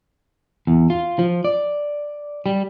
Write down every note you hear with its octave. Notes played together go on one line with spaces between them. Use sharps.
E2
F4
F3
D5
G3